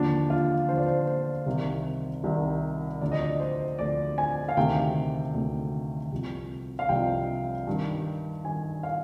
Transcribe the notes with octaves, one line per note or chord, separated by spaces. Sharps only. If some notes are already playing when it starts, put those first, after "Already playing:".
Already playing: D#2 D3 F3 D4
F4
D#2 D3 F3 C5
D5
C5
C5
C2 C3 D#3
C2 C3 D#3
D2 D3 F3 D5
D#5
D5
C5
D2 D3 F3 D5
G#5
F5
D2 C3 D#3 G5
D2 C3 D#3
C2 C3 F3
F5
C2 C3 F3 G5
G2 D#3
G2 D#3 G#5
F5